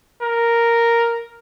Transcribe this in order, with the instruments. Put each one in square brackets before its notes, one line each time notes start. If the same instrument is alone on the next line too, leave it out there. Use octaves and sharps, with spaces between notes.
[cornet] A#4